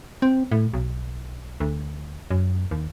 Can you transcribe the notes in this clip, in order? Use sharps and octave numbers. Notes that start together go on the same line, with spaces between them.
C4
A2
B1
D2
F#2
D#2